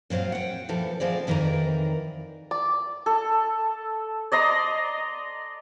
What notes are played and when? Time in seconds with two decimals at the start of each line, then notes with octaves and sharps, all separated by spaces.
0.10 A#2 F#3 C4 F4 F5
0.32 F#5 G5
0.69 A#2 E3 F3 A4
1.00 F3 C4 G#4 D5
1.27 F2 D#3 E3 A#4 D5 A#5
2.51 D5
3.06 A4
4.32 D5 D#5 A#5 C6